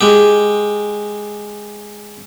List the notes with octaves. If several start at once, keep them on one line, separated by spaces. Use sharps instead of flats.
G#3 G4